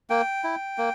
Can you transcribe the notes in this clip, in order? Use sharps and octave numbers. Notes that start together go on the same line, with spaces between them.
A#3 G5
E4
A#3